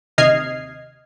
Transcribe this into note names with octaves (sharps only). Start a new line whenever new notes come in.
D#2 C3 D#5 F6 G#6 C7